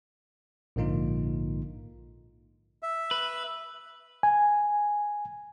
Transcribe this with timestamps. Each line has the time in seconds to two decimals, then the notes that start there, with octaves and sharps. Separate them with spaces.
0.76 A#1 G#2 D3 A#3 D#4 F4
2.83 E5
3.11 B4
4.23 G#5